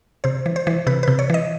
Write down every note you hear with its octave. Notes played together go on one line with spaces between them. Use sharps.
C3 C5
E3
C5
E3
C3 B4
C3 B4
C#5
E3 D#5